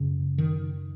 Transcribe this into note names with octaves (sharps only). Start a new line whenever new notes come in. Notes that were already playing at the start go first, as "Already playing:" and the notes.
Already playing: F#2 C#3
D#3